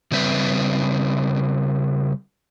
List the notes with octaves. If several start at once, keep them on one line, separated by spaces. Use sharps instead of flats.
C#3 G3 C4 B4 E5